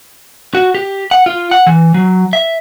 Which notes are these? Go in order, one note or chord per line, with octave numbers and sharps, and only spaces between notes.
F#4
G4
F#5
F4
F#5
E3
F#3
E5